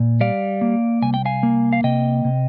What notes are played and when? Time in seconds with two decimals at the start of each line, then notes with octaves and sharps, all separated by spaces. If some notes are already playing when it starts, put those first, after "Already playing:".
Already playing: A#2
0.21 G3 D5 F5
0.61 A#3
1.02 C2 G#5
1.14 G5
1.25 F5 G#5
1.43 A#3
1.73 F5
1.84 C3 D#5 G5
2.25 C3